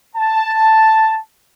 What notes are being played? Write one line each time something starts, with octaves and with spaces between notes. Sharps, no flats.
A5